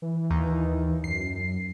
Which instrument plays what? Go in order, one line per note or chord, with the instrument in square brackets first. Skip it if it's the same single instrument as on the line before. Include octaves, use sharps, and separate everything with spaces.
[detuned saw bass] E3
[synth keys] D#2 D#4
[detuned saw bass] F#2 [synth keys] C7